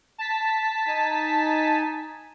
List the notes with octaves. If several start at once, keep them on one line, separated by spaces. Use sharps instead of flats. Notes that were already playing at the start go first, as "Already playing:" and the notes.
A5 B6
D#4 G#5